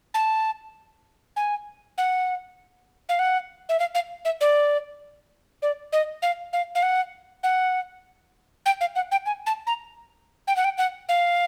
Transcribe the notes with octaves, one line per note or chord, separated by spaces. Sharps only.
A5
G#5
F#5
F5
F#5
E5
F5
F5
E5
D5
D5
D#5
F5
F5
F5
F#5
F#5
G5
F5
F#5
G5
G#5
A5
A#5
G5
F#5
G5
F#5
F5